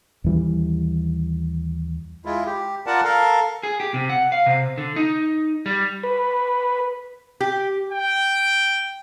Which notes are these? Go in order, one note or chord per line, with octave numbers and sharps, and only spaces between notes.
D#2 E3 G3
G#3 E4 F4
G4
F4 A#4 D5 F#5 A5
A4 A#4 F5
G#4
G4
C3
F#5
F5
C3
D3
D#4
G3
B4
G4
G5